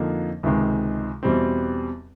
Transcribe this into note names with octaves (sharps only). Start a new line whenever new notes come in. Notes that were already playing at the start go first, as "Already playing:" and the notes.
Already playing: F2 D3 F3 A#3 D#4
C#2 C3 D#3 G#3
E2 B2 G3 C4